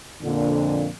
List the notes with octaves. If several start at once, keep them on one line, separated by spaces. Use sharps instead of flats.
F2 A#2 D3